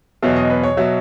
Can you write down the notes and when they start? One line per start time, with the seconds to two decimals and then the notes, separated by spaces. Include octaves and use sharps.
0.22 E2 B2 F#3 E5
0.36 D#5
0.50 B4
0.63 C#5
0.77 B2 F#3 E5